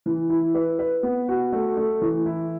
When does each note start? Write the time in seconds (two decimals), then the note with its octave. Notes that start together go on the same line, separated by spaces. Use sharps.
0.06 E3
0.30 E4
0.54 B4
0.79 B4
1.03 B3
1.28 F#4
1.52 A3
1.77 A3
2.02 E3
2.26 E4